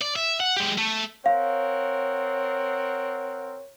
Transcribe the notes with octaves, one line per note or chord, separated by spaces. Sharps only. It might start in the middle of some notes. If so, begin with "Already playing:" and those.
D5
E5
F#5
G#3 G4
A3
C4 A#4 C#5 F5 F#5